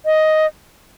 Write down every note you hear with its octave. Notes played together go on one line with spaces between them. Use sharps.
D#5